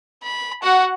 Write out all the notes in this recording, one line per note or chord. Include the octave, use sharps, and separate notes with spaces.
B5
F#4 F#5